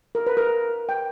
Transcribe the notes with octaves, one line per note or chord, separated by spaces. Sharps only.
A#4
B4
A#4
G5